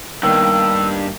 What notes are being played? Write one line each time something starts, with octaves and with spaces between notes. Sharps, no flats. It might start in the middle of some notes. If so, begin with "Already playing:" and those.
G2 D#3 A#3 B3 E6